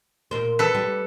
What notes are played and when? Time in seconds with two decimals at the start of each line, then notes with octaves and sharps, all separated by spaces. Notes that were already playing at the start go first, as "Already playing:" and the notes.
0.31 A#2 A#4 C5
0.59 A4 B4
0.75 G3